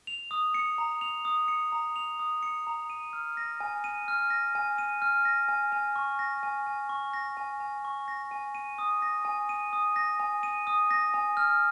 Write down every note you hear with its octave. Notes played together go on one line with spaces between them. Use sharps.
F7
D#6
C#7
A#5
F7
D#6
C#7
A#5
F7
D#6
C#7
A#5
D#7
F6
A#6
G#5
D#7
F6
A#6
G#5
D#7
F6
A#6
G#5
G#5
C#6
A#6
G#5
G#5
C#6
A#6
G#5
G#5
C#6
A#6
G#5
D#7
D#6
A#6
G#5
D#7
D#6
A#6
G#5
D#7
D#6
A#6
G#5
F6